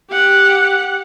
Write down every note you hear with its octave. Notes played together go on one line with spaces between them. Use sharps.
G4 F#5